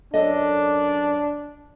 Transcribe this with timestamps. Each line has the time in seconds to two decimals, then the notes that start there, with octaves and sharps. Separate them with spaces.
0.14 F#2 D4 A4 D#5